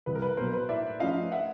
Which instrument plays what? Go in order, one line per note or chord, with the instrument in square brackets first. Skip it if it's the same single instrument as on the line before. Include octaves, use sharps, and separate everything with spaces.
[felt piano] C2 [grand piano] B4
[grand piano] A#4
B4
[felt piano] B2 F#3 A#3 [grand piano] A#4 C5
[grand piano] B4
[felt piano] A2 [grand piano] D5 E5
[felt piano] F3 A3 C#4 F4 [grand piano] D#5 F5
[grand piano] E5 F#5